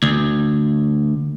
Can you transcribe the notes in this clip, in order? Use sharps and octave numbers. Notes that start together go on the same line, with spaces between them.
D2